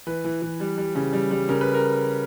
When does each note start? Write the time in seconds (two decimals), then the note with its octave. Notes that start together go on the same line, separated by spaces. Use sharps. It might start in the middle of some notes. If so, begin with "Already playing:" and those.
0.07 E3 B4
0.25 E3
0.42 E3
0.60 G3
0.78 G3
0.95 C#3
1.13 G3
1.31 G3
1.49 C#3 A#4
1.61 B4
1.74 A#4